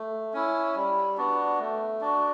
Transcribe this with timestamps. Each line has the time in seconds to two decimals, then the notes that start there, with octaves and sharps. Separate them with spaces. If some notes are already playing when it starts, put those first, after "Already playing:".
Already playing: A3
0.33 C#4 E4
0.76 G3
1.17 B3 D4 F#4
1.60 A3
2.01 D4 F#4